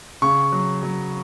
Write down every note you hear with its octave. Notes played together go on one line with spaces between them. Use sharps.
C#3 C#6
F#3
F#3